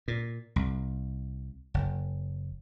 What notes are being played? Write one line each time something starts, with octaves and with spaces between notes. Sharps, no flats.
A#2
C2
F#1